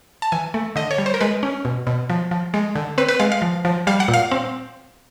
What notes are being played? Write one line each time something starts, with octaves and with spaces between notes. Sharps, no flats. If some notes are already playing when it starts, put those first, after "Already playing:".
A5
E3 G#5
A3
D3 D#5
C#5
G3
C5
A#4
G#3 B4
C#4
B2
B2
F3
F3
G#3
D3
C4 B4
B4
G#3 F5
F5
F3
F3
G3 F5
F#5
A#2
F5
C4